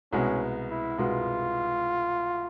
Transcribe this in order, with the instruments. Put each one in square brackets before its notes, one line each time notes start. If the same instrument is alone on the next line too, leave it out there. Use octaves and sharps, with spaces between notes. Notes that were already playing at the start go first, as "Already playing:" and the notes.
[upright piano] C2 B2 G#3 B3 [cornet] C#4
[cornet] E4
[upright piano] C2 B2 G#3 B3 [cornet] F4